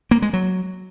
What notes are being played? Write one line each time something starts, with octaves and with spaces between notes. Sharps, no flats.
A#3
G#3
F#3